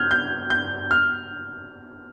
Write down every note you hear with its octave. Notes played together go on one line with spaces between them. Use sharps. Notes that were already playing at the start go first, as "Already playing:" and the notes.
Already playing: F6 G6 G#6
G6
G6
F6